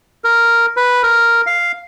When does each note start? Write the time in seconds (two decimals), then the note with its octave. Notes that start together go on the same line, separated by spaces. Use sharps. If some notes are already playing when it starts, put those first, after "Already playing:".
0.24 A#4
0.77 B4
1.03 A#4
1.46 F5